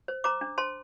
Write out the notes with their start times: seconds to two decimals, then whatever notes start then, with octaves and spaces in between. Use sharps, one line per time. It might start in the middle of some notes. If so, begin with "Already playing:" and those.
0.08 C5
0.24 C5 A#5 D6
0.41 D4
0.58 C5 A5 C6